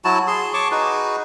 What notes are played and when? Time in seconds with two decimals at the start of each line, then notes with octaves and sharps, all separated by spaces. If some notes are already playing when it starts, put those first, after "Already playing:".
0.05 F#3 E4 F#4 A5
0.28 G#4 C6
0.54 C#5 A5 C#6 D6
0.71 D#4 F#4 G#4 B4